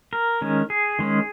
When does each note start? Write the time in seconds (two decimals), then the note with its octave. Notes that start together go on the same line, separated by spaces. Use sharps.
0.13 A#4
0.42 D#3 G#3 C#4
0.70 G#4
0.99 D#3 G#3 C#4